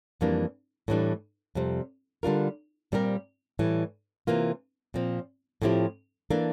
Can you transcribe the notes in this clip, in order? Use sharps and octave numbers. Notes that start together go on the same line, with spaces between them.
F2 E3 G3 A#3 D4
A2 E3 G3 D4
F2 C3 G3
D3 G3 D4 F4 A#4
A#2 G3 C4 G4 A#4
A2 E3 G3
C3 E3 A#3 F4
A#2 F3 C4
A2 F3 C4 E4 G4
E3 A#3 D4 A4